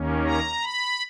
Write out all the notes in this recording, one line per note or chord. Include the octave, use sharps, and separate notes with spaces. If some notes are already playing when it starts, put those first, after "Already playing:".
Already playing: D#2 D#3 A#3 C#4
A#5
B5